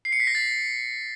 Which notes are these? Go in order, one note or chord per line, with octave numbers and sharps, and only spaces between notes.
C7
C#7
B6
A#6
A6